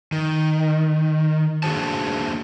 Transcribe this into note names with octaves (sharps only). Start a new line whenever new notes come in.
D#3
A#3 D4 F#4 G#4 C5 A5